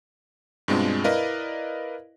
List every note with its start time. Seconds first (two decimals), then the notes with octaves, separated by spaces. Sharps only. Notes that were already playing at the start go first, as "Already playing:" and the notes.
0.68 G2 B2 G#3 C4 D4 F4
1.04 E4 A#4 B4 D5 D#5 F5